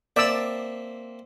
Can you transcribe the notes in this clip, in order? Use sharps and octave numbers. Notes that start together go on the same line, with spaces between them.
A#3 C4 D5 E5 E6